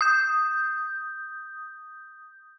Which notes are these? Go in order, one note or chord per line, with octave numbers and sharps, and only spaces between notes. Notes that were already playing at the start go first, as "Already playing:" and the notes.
D#6 G6